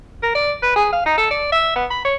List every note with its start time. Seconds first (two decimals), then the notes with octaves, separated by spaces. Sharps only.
0.23 A#4
0.35 D5
0.62 B4
0.76 G#4
0.92 F5
1.06 D#4
1.18 A4
1.30 D5
1.52 E5
1.76 B3
1.90 B5
2.05 C#5